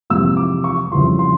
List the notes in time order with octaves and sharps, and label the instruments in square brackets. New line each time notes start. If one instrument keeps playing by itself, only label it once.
[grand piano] F2 C3 E3 G#3 E6
D6
C#6
F2 C#3 E3 G3 C6
C6